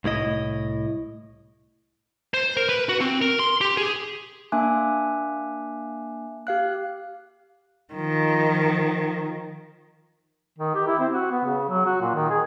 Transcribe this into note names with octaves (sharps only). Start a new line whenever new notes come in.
C2 A2 E4 D#5
C5
A#4
B4
F#4
C4
A#4
C6
G4
G#4
A#3 D4 E5 G#5 D6 F#6
G4 F5 F#6
D#3 F3
D#3
G4
E4
C4
F#4
B3
C#3
F#3
F#4
A#2
D#3
G#4